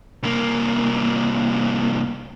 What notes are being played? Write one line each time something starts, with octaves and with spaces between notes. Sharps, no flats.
C2 A#3